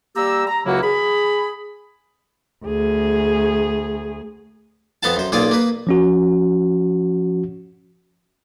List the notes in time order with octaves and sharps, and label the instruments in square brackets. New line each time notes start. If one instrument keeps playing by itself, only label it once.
[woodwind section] G3 A#3 G4 A#5 E6
A#5
C#2 C#3 F#3 A#3 E4 F#4
G#4 B5
[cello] D2 G#4
[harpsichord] F2 B3 A4 F5 A5
F#2 C5
B1 A#3 F4 G#4 D5
A#3 B4
[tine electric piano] F3 C#4 F#4